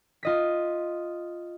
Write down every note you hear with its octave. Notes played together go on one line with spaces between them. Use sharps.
F4 D#5 B6